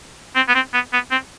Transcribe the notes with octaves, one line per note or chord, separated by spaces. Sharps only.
C4
B3
C4
B3
B3
C4